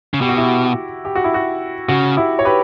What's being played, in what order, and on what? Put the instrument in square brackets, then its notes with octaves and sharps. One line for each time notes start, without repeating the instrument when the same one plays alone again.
[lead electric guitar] C#3
[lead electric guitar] B2 [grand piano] G4
[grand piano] F#4
E4 G4
G4
F#4
E4
F#4
[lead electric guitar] C#3 [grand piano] F#4
[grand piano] E4 G4
C#5
G4 B4